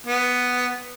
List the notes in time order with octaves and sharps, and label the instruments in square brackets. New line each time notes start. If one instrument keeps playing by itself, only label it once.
[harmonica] B3